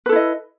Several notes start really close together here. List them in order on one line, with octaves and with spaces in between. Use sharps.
B4 A4 E4 D#5